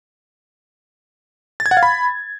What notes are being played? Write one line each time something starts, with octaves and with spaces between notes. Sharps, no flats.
A6
G#6
F#5
F5
B5